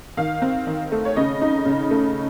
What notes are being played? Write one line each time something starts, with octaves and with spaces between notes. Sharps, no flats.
D#3 F5
C4
D#3
A3
C#5
C#3 D#5
D#4
C#3
A3